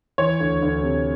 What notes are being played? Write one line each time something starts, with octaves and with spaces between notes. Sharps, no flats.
E3 C#5
D2
D2
C3